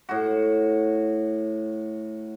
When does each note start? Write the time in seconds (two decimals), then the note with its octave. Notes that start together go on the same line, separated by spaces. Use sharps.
0.09 A2 F#4